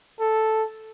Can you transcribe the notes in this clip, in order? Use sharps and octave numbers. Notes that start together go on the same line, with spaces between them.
A4